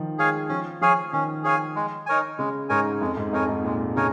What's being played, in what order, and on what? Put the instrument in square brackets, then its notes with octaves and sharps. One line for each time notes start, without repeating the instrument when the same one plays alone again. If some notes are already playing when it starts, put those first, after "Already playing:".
Already playing: [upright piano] D#3 F3
[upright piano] G#3 [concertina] G#4 C#5 F5 G#5
[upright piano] F3 [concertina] C#4
[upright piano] F3 [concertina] G#4 C#5 F5 G#5
[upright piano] D#3 [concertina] C#4
[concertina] G#4 C#5 F5 G#5
G#3
D#4 A#4 C#5 G#5
[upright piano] C#3 [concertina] G#3
[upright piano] G#2 [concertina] D#4 A#4 C#5 G#5
[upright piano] F2 [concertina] G#3
[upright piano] G#2
[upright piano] F2 [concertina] D#4 A#4 C#5 G#5
[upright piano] G#2
[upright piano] A#2 [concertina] G#3
[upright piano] C#3 [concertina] D#4 A#4 C#5 G#5